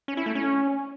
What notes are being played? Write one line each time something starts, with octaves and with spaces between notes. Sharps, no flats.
C#4
E4
A3
C#4